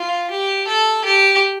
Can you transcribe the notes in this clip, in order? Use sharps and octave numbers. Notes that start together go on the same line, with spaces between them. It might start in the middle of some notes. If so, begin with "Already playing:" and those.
Already playing: F4
G4
A4
G4